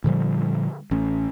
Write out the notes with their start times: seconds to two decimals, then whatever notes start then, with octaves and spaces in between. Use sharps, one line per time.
0.04 A#2 D3 F3 G3
0.91 A1 C#4